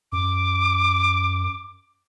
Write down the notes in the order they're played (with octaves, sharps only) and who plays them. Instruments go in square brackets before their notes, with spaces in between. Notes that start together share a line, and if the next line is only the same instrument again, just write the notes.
[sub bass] F#2 [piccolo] D6